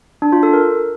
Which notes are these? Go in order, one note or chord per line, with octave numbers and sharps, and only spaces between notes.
D4
F4
A4
A#4